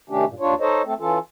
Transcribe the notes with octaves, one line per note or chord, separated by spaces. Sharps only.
C3 D#3 A3 C#4 D4 G4
G2 A#2
D#2 D4 F4 C#5
D#4 A4 C5 C#5 D#5
A3 C4 A4
E3 C#4 F4 A4